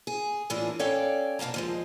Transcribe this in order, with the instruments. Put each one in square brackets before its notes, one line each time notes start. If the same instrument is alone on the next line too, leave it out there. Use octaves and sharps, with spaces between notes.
[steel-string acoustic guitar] G#4
A2 E3 A#3 D4 F4 G#4
C#4 A4 C#5 D5 F5 G5
B2 A#3 F5 A5 A#5
D#2 F3 G#3